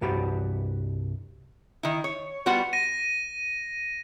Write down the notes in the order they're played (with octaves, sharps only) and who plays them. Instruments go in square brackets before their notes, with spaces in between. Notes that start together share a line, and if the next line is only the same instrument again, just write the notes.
[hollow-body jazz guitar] C2 G2 F#4 G4 B4 B5
[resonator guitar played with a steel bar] D#3 E4
C#5
G3 B3 F4 F#4 F#5
[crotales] A#6 D#7